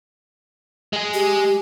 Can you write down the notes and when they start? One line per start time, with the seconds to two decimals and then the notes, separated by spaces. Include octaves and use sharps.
0.93 G#3 G#4
1.14 G4